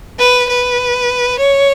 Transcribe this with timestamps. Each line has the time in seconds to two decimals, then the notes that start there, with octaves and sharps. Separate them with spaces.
0.19 B4
0.49 B4
1.39 C#5